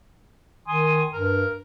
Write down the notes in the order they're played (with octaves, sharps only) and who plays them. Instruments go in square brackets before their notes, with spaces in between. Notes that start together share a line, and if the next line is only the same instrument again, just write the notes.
[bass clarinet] D#3 [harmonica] G#5 C6 D#6
[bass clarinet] G2 [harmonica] A#4